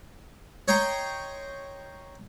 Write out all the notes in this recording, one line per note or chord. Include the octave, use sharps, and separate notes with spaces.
C#5 D#5 G5 A#5 C6